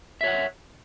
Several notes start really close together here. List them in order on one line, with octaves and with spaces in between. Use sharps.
E5 C#5 F#5